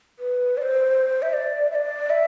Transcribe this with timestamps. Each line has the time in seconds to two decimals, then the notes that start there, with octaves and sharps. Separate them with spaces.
0.19 B4
0.57 D5
0.62 C5
1.22 E5
1.33 D5
1.71 E5
1.75 D5
2.10 E5